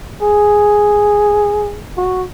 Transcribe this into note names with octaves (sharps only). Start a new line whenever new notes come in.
G#4
F#4